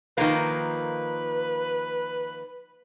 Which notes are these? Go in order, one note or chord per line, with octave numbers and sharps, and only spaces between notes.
D#3 F3 A#3 B4